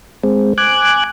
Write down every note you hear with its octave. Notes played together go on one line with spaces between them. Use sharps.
G#3 C4
G#5 D6 F#6